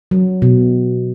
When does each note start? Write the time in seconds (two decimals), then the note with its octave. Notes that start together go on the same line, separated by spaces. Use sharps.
0.11 F#3
0.42 B2